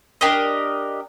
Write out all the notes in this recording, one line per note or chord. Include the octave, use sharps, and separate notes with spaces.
D4 G4 A#4 D#5